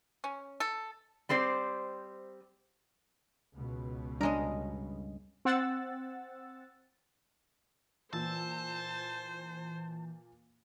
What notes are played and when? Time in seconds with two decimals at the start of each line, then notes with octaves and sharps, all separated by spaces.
0.24 C#4
0.60 A4
1.29 G3 C4 C5 D5
3.56 C#2 B2
4.21 G2 G#3 C#4 D4 A#4 D#5
5.45 C4 F#5 E6 A6
8.13 A#2 E3 C5 A5 E6